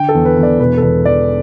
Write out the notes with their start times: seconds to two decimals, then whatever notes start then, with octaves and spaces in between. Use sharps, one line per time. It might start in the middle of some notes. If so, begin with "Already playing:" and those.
Already playing: D3 G5
0.09 A4
0.14 E2
0.25 B4
0.37 E2
0.43 D5
0.59 E1 B4
0.77 A4
0.82 E1 B4
1.05 E2 D5